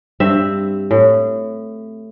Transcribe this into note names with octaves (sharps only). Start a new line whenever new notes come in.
G2 C4 E5
A2